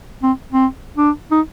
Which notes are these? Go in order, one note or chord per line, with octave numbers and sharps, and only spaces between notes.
C4
C4
D4
D#4